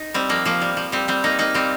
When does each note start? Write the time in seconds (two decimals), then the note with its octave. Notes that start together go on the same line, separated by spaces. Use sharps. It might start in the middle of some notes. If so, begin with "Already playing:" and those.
Already playing: D#4
0.14 G3 C4
0.29 F3 A#3
0.45 F3 A#3
0.62 G3
0.77 F3
0.92 G3 C4
1.08 G3 C4
1.24 A#3 D#4
1.39 A#3 D#4
1.54 G3 C4